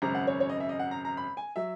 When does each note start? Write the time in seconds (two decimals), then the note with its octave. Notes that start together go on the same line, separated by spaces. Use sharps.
0.02 G#1 F#2 C#3 A#5
0.15 F#5
0.27 C#5
0.40 C#5
0.50 D#5
0.60 E5
0.69 D#5
0.79 F#5
0.91 A#5
1.05 A#5
1.17 B5
1.37 G#5
1.56 F#3 E5